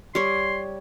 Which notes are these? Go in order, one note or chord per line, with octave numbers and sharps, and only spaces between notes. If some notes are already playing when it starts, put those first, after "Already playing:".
G3 C#5 C6